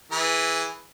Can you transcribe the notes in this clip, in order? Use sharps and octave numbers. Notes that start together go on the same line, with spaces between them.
E3 G#4 B4